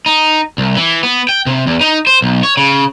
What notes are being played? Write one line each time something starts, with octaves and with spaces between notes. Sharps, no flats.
D#4
C2
E3
B3
G5
C3
E2
D#4
C5
B1
C#5
C#3